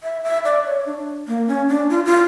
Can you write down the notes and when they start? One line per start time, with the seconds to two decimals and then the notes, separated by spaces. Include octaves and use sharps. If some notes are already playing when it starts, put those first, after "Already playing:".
0.03 E5
0.24 E5
0.45 D5
0.66 C#5
0.86 D4
1.28 A#3
1.48 C#4
1.69 D4
1.90 F4
2.05 F4